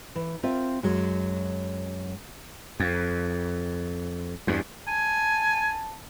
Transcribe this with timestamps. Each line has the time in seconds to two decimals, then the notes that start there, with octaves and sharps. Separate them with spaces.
0.15 E3
0.43 C4 F4 A#4 E5
0.83 F#2 F#3 G#3
2.80 F2
4.47 E2 G2
4.88 G#5 A5